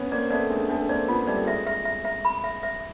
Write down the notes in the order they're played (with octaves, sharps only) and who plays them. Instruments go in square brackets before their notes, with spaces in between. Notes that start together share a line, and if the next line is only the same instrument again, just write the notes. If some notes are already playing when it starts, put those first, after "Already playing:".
Already playing: [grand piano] B3 C#4
[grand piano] A#3 C4 [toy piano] D5
[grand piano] A3 B3 [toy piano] D5
[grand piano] G#3 [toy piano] D4
[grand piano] A3 B3 [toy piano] D4
[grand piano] A#3 C4 [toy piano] D5
[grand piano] A3 B3 [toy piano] F4
[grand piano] G3 A3 [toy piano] D5
[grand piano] G#3 [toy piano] E5
[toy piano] E5
E5
E5
B5
E5
E5